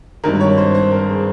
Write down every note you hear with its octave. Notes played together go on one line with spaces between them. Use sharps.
G#1 G2 D#3 A#4
C#5
C5
C5
A#4
G#4